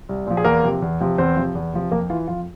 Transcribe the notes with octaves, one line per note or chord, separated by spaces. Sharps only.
C2
A#2 F3
G#4
E2 A#3 A#4
C3 F3
E2
C3 F3
E2 C4 C5
C3 F3
E2
C3 F3
F2 A#3 A#4
E3 F4
F2 F4